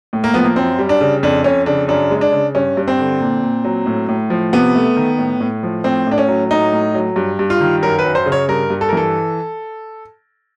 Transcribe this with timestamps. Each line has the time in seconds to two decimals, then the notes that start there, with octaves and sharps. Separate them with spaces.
0.13 A2
0.24 A#3
0.34 F3 B3
0.44 A#3
0.56 F#2 C4
0.79 G3
0.89 D4
1.01 C#3
1.23 F2 D4
1.44 F2 C#4
1.66 C#3 D4
1.88 F#2 D4
2.11 G#3
2.21 D4
2.32 C#3
2.55 G2 C#4
2.77 G2
2.88 C4
2.99 D3
3.20 A#2
3.42 A#2
3.64 F#3
3.86 A2
4.09 A2
4.30 F3
4.53 C3 B3
4.75 A3
4.96 D#3
5.18 A2
5.40 A2
5.63 F3
5.84 A2 C4
6.07 A2 D4
6.18 C#4
6.28 F#3
6.50 A2 D#4
6.72 A2
6.95 F#3
7.16 G2
7.39 G2
7.50 F4
7.60 D#3
7.82 F#2 A#4
7.99 B4
8.05 F#2
8.15 C5
8.26 C#3
8.32 C#5
8.48 G2 A#4
8.70 G2
8.81 A4
8.89 A#4
8.93 E3 A4